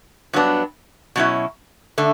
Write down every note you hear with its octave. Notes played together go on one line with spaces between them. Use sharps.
G2 F#3 B3 D4
B2 F#3 C#4 E4
D3 A3